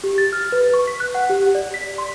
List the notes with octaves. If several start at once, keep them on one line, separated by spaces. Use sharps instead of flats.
G4
A6
F6
B4
C#6
B6
F#6
F#5
G4
D5
B6
C6